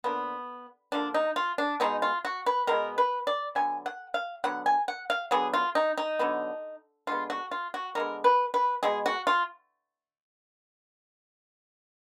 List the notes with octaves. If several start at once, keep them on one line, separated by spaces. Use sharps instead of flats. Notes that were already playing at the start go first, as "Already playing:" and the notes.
D3 F3 A#3 B3
D3 F3 A#3 D4
D#4
F4
D4
B2 G#3 B3 D#4
F4
F#4
B4
B2 G#3 B3 A#4
B4
D5
D3 F#3 B3 G#5
F#5
F5
D3 F#3 B3 F#5
G#5
F#5
F5
D3 F#3 B3 G#4
F4
D#4
D#4
D3 F#3 B3
D3 G#3 B3 F4
F#4
F4
F#4
D3 G#3 B3 A#4
B4
B4
B2 G#3 B3 G#4
F#4
F4